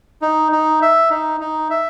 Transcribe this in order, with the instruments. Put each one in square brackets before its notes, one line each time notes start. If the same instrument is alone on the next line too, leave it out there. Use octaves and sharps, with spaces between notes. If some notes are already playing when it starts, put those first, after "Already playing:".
[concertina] D#4
D#4
E5
D#4
D#4
E5